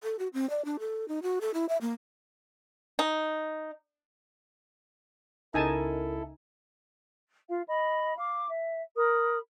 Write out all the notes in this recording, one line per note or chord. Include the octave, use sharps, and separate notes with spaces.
A4
F#4
C4
D5
D4
A4
D#4
F#4
A4
E4
E5
A#3
D#4
C#2 C#3 D#4 E4 A4 A#4 G#5 A5
F4 F5
D#5 B5
F5 D6
E5
A#4 B5 D#6